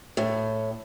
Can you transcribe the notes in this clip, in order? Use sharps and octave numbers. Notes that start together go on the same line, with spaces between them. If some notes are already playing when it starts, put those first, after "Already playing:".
A2